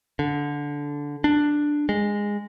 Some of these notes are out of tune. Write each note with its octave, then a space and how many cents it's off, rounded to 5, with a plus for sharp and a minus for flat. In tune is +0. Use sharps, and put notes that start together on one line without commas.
D3 -15
D4 +5
G#3 -15